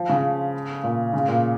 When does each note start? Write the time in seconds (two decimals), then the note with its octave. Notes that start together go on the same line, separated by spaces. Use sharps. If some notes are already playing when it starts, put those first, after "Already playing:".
Already playing: F3
0.09 C#3
0.83 A#2
1.13 C#3
1.28 A#2